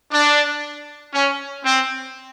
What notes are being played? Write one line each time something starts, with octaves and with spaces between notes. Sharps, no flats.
D4
C#4
C4